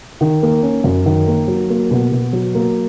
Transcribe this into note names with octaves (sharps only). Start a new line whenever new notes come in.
D#3
A#3
C#4
F#2
D#3
A#3
F#3
A#3
B2
B2
F#3
A#3